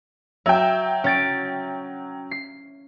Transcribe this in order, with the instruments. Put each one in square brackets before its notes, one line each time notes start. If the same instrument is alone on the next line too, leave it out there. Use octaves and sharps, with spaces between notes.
[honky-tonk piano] F#3 G5 [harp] E5
[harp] C#4 A6 D7
C7